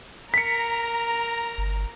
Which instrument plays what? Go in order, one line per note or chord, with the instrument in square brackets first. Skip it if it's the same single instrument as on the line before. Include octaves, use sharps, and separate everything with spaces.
[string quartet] A#4 [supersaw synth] A#5 [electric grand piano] B6 C#7
[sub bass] G1